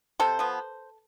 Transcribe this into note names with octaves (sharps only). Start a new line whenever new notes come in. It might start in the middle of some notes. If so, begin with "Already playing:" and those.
C3 A4 C5
F3 B3